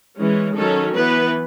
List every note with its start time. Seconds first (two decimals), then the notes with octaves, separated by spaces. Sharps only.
0.17 E3 G#3 C#4
0.56 D#3 F#3 C#4 A4
0.96 E3 B3 B4